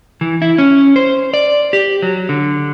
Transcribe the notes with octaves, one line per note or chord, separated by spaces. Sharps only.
E3
E4
C#4
C5
D5
G4
F#3
D3